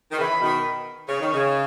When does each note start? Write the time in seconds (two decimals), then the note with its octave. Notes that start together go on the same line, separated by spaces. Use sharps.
0.12 D#3
0.18 C#3 E3 B5
0.41 B2 D#3
1.09 C#3 C#5
1.21 D#3
1.33 C#3